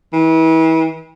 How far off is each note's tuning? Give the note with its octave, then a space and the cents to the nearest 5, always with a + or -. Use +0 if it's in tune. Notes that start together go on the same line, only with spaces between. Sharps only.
E3 -35